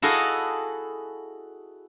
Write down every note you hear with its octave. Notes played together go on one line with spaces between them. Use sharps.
E4 F#4 G#4 A4 D#5 F5